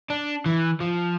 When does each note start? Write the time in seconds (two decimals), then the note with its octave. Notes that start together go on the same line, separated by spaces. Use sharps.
0.10 D4
0.46 E3
0.81 F3